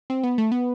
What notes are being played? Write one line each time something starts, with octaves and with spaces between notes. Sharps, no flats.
C4
B3
A3
B3